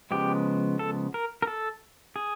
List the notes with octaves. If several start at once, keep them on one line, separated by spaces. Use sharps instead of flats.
C#3 F3 G#3 B3 G4
A4
A#4
A#4
A4
G#4